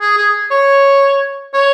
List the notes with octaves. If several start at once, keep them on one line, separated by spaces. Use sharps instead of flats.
G#4
G#4
C#5
C#5